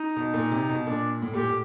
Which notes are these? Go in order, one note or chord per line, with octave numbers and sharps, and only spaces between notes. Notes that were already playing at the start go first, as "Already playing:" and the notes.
Already playing: D#4
B2
A#2
C3
B2
A#2 D4
A2
A#2 G4
A2